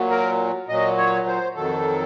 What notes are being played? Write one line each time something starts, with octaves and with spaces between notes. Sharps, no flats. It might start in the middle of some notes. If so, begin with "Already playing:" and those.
Already playing: A#2 F#3
A#4
A#2 F#3 D#5
C#5
C5
F2 D#3 F#3 A4